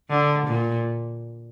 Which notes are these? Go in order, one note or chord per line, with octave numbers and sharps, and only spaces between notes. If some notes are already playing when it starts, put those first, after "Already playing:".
D3
A#2